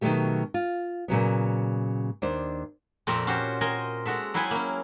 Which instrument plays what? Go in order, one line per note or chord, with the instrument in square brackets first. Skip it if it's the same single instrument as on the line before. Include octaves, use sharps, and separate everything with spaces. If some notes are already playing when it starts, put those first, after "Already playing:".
[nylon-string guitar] B2 D#3 E3 F#3 A3 G4
F4
A#2 C#3 F#3 B3
D#2 D4 C5
[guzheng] F2 A#2 C4 A#4 E5
C#4 F#4 G4 C5
A#4 C5 D#5 G#5
G#3 F#4 A4 E5
F#3 E4 G#4 B4 G5 G#5
A#3 C#4